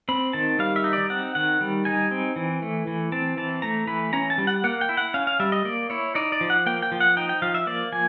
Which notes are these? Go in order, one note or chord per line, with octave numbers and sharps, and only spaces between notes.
C4 B5
D#3 A5
G3 F5
E5
D#4
D5
C4 F#5
D#3 F#5
G3
D#4 G#5
C4
E3
A3
E3
C4 A5
E3 A5
A3 A#5
E3 B5
C#4 A#5
A5
G3
F#5
A#3 F#5
G5
E4
F#5
C#4 F5
F5
G3 E5
D#5
A#3 D5
E4 C#5
D#4 D5
D5
F3
F#5
A#3 G5
G5
F3
F#5
D#4 G5
G5
F3 F5
E5
A#3 D5
F3 G#5